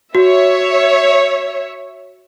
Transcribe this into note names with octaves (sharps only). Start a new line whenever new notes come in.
F#4 C#5 E5